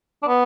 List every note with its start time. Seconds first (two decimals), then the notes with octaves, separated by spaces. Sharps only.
0.23 D4
0.28 B3